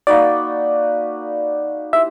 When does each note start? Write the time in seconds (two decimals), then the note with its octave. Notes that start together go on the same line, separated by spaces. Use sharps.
0.07 A#3 D#4 F#4 B4 D5
1.93 E4 G4 C5 D#5 E5